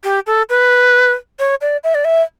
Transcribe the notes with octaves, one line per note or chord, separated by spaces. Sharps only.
G4
A4
B4
C#5
D5
E5
D5
E5